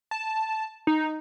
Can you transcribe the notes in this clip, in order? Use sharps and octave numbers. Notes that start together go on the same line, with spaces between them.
A5
D#4